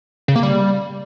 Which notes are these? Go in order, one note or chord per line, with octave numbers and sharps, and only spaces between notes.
C#3
A#3
G3